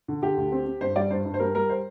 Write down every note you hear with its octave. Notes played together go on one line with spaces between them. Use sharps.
D3
D3 G4
D2
C4
C4
G2 C5
G3 D5
G2 C5
G2
C5
G3 A#4
G3 A#4
C5